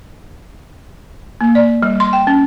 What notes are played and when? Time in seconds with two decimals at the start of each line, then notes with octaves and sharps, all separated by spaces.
1.41 A#3
1.55 D5
1.83 G3
2.00 C6
2.13 G5
2.27 C#4